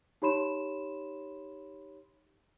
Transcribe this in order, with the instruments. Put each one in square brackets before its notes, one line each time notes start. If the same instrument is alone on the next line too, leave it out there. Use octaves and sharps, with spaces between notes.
[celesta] D#4 G4 C#5 B5 C6 E7